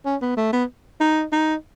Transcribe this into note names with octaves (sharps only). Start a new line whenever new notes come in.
C#4
B3
A3
B3
D#4
D#4